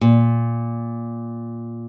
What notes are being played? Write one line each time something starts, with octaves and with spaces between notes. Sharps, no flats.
A#2